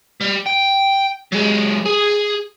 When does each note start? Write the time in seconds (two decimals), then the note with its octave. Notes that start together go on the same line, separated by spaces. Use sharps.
0.21 G3
0.47 G5
1.32 F#3 G#3
1.86 G#4